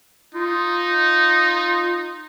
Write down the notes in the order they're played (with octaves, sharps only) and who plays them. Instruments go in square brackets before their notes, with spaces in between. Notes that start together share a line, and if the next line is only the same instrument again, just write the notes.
[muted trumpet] D#4 [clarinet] F4